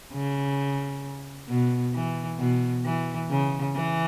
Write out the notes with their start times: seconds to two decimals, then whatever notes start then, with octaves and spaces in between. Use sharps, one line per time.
0.13 C#3
1.49 B2
1.94 E3
2.39 B2
2.85 E3
3.30 C#3
3.75 E3